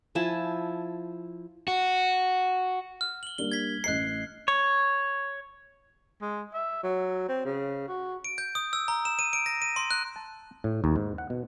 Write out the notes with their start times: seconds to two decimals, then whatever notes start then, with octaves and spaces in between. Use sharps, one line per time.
0.15 F3 E4 G#5 A5
1.68 F#4
3.01 F6
3.23 F#7 G7
3.38 G3 A#3 D4 G7
3.52 G#6 B6
3.84 A1 D#5 F#6 C7 C#7
4.48 C#5
6.21 G#3
6.54 E5
6.83 F#3
7.29 C4
7.45 C#3
7.88 F#4
8.24 D7
8.38 G6
8.55 D#6
8.73 E6
8.88 A#5
9.05 E7
9.19 D#7
9.33 D7
9.46 A#6
9.62 D#7
9.76 C6
9.91 F#6
10.16 A5
10.64 A2
10.84 D#2
10.96 G#2
11.18 F#5
11.30 B2